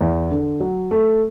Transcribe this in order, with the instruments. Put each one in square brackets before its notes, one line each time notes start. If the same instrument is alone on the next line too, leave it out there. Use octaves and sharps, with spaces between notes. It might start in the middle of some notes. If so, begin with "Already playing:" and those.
[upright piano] E2
D3
F#3
A3